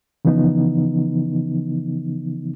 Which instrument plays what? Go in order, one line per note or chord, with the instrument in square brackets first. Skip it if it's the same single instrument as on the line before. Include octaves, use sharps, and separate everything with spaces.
[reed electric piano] C#3 E3 F3 B3 D#4